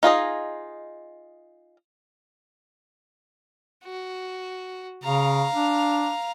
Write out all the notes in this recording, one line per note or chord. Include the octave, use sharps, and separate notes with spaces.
D#4 F4 G#4 D#5
F#4
C#3 F5 A#5
D4